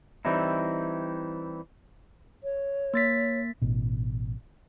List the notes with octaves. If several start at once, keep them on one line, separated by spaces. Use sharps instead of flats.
E3 G3 C4 D#4 E4
C#5
A#3 A6 B6
A1 B2